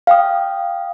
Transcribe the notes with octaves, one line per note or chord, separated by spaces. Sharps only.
F5 G5 D#6